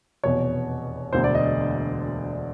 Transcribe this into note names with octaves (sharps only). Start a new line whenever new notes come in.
F1 E2 B2 C#5
E1 D2 D3 C5
D5
D#5